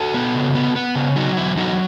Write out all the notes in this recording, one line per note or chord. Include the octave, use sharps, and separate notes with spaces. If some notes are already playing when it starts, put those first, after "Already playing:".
Already playing: F#4 A4
B3
C#3
B3
B3
C#3
F#3 D#4 F#4
E2 E4
F#3 D#4 F#4